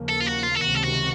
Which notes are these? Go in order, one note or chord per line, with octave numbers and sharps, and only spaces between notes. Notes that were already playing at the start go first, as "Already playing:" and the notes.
Already playing: D#2 C#3 F3 A#3
A4
F4
F#4
F4
A4
C#2 C3 D#3 F#4
A4
F#4